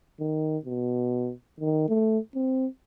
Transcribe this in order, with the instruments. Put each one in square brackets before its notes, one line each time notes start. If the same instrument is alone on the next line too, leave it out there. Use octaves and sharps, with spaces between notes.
[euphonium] D#3
B2
D#3
A3
C4